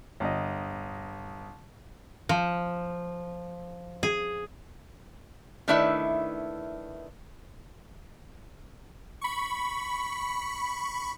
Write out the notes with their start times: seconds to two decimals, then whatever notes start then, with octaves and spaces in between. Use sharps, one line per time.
0.20 G1 D#5
2.29 F3
4.03 G#4
5.68 D#3 A3 D4 E4 B4 E5
9.21 B5 C#6